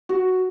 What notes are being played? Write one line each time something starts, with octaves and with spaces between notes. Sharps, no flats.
F#4